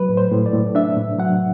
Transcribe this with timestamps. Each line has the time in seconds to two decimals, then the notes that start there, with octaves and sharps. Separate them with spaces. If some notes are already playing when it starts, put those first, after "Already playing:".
Already playing: F#3 B4
0.09 A2
0.17 C5
0.32 A2
0.46 D5
0.53 A2
0.75 D4 E5
0.97 A2
1.18 F#3 F#5